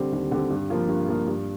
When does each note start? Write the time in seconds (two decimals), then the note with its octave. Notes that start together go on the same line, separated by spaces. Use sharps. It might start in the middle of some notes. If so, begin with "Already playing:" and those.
Already playing: D3 G3 C4
0.12 D#2
0.31 D3 G3 C4
0.50 G2
0.70 F3 A#3 F4
0.88 G2
1.08 F3 A#3 F4
1.27 G2